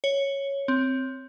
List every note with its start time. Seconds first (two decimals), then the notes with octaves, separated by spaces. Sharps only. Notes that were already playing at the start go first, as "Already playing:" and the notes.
0.04 C#5
0.68 C4